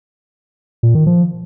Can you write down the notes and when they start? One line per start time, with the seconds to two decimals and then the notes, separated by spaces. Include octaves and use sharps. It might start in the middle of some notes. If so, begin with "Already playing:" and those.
0.83 A#2
0.95 D#3
1.07 F3